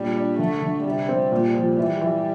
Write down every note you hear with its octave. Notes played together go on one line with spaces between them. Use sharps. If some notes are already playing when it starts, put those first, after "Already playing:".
Already playing: A#2 G3 D4
D4
D3 A3
D3
C3 G3
C4
A#2
F3
E3 G3
E3